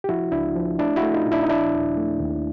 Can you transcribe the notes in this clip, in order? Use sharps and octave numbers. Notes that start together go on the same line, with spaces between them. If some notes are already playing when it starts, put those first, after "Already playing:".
G4
F3 E4 F#4
C#2 D4 E4
F3
A3 D4 E4
E4 F#4
A3
D#4 F4
A#2
D4 E4
D#4
F3 D4 E4
D#2
A3
D#2